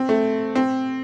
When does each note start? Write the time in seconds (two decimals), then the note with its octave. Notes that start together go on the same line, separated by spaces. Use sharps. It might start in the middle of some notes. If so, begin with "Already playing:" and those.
Already playing: C4
0.09 A3
0.55 C4